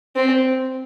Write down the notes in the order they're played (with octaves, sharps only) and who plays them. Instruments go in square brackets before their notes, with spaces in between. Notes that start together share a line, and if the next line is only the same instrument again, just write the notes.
[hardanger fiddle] C4